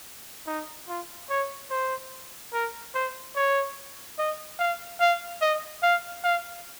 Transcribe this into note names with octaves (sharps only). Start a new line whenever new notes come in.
D#4
F4
C#5
C5
A#4
C5
C#5
D#5
F5
F5
D#5
F5
F5